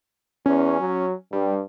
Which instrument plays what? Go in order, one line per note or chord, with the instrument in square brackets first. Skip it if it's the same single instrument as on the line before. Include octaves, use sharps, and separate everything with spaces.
[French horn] E2 [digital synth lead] C#4
[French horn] F#3
[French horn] G2 [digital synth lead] G3